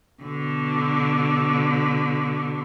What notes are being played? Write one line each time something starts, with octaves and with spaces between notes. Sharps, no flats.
B2 D3